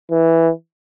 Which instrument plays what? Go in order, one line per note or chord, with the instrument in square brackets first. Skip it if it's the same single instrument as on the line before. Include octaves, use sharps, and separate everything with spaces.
[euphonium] E3